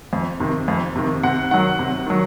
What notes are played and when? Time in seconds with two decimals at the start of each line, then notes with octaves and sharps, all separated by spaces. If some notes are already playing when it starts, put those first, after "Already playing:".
0.13 F2
0.40 C3 D#3
0.68 F2
0.96 C3 D#3
1.23 C3 F#5
1.51 D#3 F#3 F#5
1.79 C3
2.07 D#3 F#3